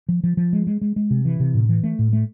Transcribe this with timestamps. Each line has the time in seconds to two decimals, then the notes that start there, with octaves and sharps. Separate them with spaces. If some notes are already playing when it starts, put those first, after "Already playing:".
0.09 F3
0.24 F3
0.37 F3
0.53 G#3
0.67 G#3
0.81 G#3
0.96 G#3
1.11 C3
1.25 E3
1.40 C3
1.54 A2
1.69 E3
1.83 A3
1.99 A2
2.13 A3